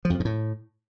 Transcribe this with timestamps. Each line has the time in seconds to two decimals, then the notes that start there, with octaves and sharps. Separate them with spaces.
0.05 F3
0.10 F2
0.15 F3
0.20 G#2
0.25 A2